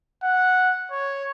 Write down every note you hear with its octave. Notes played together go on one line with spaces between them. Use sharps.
F#5
C#5